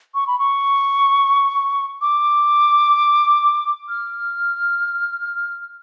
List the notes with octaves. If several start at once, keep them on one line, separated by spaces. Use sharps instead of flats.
C#6
B5
C#6
D6
F6